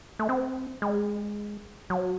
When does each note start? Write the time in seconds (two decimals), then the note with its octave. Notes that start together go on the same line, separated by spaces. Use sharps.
0.19 A3
0.29 C4
0.82 G#3
1.90 F#3